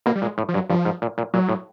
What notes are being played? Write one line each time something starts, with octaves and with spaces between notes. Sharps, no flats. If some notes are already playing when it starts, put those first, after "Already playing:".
B2 A#3
G3
A#2 G#3
A2
F3
G2 F#3
G2 F3
G#2
A#2
A#2
A#2 F#3
A2